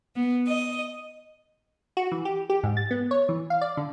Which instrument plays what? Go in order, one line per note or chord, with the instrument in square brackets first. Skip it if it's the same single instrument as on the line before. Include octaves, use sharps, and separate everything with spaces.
[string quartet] B3
D#5
[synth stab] F#4
E3
G4
G4
G#2
A6
B3
C#5
E3
F5
D5
D3